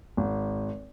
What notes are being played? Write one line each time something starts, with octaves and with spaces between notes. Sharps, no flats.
G#1